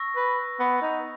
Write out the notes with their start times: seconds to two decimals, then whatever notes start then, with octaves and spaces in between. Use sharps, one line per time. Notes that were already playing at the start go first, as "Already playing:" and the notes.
Already playing: C#6 E6 A#6
0.16 B4
0.60 B3
0.82 D#4